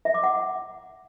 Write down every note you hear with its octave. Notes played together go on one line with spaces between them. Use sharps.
E5
D6
F#5